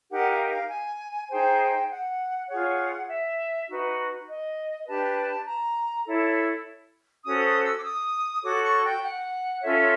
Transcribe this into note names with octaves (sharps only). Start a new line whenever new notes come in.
D#4 G4 A#4 F#5
F5
F5
G#5
D#4 G#4 C5 G5
F#5
F4 G#4 C#5 F#5
E5
D#4 F#4 B4
D#5
D4 G4 B4 A5
A#5
E4 A4 C#5
C#4 F#4 A4 C5 D#6
D#6
E6
D6
D#6
F#4 A4 C#5 D6
C#6
G5
F#5
C#4 F4 A4 C#5 E5